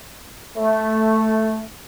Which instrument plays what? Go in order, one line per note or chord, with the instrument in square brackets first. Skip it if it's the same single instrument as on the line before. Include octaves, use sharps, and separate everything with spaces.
[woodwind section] A3